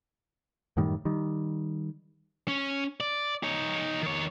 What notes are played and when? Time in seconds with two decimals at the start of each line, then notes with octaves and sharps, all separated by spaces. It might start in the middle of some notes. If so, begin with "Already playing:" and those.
0.77 F#2 A2 D#3 G3
1.05 D#3 G3
2.48 C#4
3.00 D5
3.43 D#4 C#5
4.02 D#3 C#5